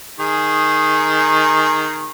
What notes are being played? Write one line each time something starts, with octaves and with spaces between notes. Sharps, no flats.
D#3 G#4